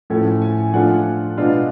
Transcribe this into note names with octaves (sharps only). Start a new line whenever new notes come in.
A2 F3 A3 C#4 G#5
G#5
G#5
F3 A3 D4 F4 F#5
B2 G#3 D4 F4